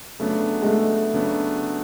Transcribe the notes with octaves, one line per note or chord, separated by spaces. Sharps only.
C#3 F#3 A3 B3 D4
G#3
A3
C#3 F#3 B3 D4